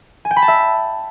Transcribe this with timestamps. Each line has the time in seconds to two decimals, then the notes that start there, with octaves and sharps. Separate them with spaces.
0.25 G#5
0.31 G5
0.36 B5
0.42 A5
0.48 E5